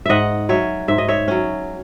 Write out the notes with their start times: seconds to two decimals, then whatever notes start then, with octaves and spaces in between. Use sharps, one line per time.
0.06 G#2 D#5 E5 F#5
0.49 F#3 C#4 C#5 E5
0.88 G#2 E5
0.98 D#5
1.08 C#5 E5
1.28 F#3 C#4